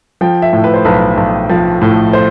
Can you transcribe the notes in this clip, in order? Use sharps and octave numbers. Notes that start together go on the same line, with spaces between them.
F3 G5
E5
A2
B4
C5
B1 B4
B1
F3
A2
C5